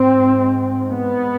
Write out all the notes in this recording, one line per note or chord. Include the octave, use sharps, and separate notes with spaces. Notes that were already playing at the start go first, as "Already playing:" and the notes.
Already playing: G#2 C4
B3